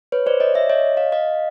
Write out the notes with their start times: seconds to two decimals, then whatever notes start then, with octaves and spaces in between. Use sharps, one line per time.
0.12 B4 C#5
0.26 C5 D5
0.40 C#5 D#5
0.54 D5 E5
0.70 C#5 D#5
0.97 D#5 F5
1.12 D#5 F5